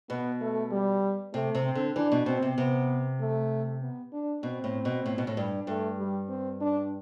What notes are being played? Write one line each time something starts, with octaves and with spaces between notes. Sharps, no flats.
B2 B3
A3
G3
C3 A3
C3
C4
D3
E3 D4
B2
B2 C4
C3
C3 B3
A3
B3
D4
B2 C4
A2
B2
A2
B2
A2
G2
G2 A3
G3
C4
D4